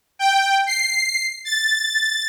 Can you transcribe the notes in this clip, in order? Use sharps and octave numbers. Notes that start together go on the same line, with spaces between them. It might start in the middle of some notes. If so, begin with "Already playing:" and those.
G5
C7
A6